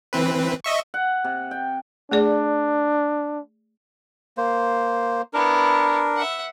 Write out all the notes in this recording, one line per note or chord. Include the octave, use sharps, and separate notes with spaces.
E3 C4 B4
D#5 E5 C#6
F#5
C3
G5
A3 D4 G#4 D5
A#3 C5
B3 D4 E4 A#4
E5 F#5